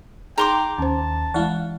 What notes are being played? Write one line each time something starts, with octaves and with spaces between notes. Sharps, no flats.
D#4 G#4 G5 A#5 C6 D6
D#2 C#4 C5 A5
E3 G#3 E4 F5 F#5